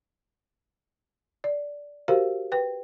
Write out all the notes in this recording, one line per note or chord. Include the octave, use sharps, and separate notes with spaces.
D5
F#4 G4 A#4 C5 F5
B4 G5